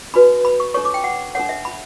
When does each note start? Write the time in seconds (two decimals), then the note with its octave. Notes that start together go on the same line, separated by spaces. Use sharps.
0.14 D4 F#4 B4 B5
0.45 B5
0.60 C#6
0.74 D4 A4 C#5 C#6
0.85 D6
0.94 G5
1.04 F#5
1.35 D4 A4 C#5 F#5
1.49 E5
1.65 B5